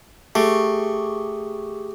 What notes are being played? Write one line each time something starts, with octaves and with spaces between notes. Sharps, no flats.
A3 G4 G#4 C#6